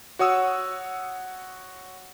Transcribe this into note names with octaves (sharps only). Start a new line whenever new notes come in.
F#4 C#5 F#5 D#6 E6